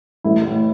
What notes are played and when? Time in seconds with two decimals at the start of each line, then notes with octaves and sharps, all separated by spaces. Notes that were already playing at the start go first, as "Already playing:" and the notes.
0.24 A1 E4
0.45 A2